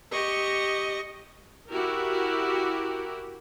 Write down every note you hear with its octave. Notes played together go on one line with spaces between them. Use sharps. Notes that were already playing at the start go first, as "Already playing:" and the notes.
G4 D#5 C#6
E4 F#4 G4 A#4